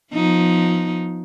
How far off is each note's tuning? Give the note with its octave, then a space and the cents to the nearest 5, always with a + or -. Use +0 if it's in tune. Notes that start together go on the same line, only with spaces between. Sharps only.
F3 +20 B3 +0 D#4 +0